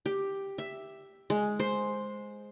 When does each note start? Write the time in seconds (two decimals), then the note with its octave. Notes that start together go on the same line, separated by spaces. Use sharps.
0.06 G4
0.58 E5
1.30 G#3
1.59 C5